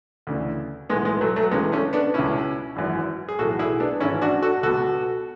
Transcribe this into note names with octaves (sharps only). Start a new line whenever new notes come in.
D2 C#3 E3
B1 A2 E3 G#3 B3
G#3 B3
F#3 A3
F#3 A3
C#2 C#3 E3 G#3 B3
A3 C#4
B3 D4
C#2 B2 C#4 E4
G#1 F#2 E3
G#4
B1 A2 E3 F#4 A4
E4 G#4
B3 D4
G#1 G#2 E3 C#4 E4
D4 F#4
F#4 A4
C#2 B2 F#4 A4